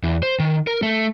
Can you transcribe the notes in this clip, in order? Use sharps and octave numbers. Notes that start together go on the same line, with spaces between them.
E2
C5
D#3
A#4
A3